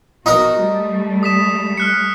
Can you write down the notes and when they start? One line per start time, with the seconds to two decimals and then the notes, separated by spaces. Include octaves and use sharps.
0.26 B2 D#4 F#4 A#4
0.59 G3 A3
1.23 D#6 B6 E7
1.77 F6 F#6 C#7